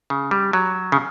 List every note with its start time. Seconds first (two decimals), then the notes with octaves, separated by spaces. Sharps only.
0.10 C#3
0.31 G3
0.53 F#3
0.92 C#3